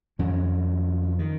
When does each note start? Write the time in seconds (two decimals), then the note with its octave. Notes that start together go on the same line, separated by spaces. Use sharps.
0.19 F2 D#3 C#4
1.19 D#3